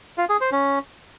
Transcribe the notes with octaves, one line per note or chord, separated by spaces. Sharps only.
F4
G#4
C5
C#4